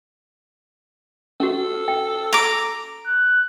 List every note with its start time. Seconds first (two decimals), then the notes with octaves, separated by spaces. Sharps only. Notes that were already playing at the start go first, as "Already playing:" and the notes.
1.40 C#4 F#4 A4
1.88 G5
2.33 A#5 D6
3.07 F#6